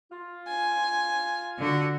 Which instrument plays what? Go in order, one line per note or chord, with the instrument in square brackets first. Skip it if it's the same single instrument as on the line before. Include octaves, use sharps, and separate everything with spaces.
[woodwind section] F4
[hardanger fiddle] G#5
[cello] D3 F#4